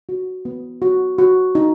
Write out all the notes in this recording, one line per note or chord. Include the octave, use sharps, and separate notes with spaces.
F#4
B3
F#4
F#4
D#4